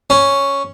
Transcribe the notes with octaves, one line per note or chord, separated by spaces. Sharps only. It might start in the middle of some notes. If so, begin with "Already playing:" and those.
C#4